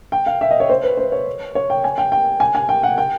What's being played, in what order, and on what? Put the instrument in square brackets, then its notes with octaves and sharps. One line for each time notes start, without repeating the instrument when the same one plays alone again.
[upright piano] G5
F5
E5
D#5
C#5
C5
B4
C5
C#5
C#5
G5
G#5
G5
G5
G#5
G#5
G5
F#5
G5